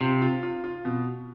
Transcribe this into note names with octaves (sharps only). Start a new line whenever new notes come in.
C3 F4
F4
F4
F4
B2